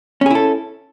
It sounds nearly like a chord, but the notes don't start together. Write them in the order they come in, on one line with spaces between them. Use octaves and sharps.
C#4 G#4 E4 A4